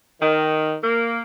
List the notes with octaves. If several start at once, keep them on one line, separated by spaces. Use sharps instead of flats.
D#3
A#3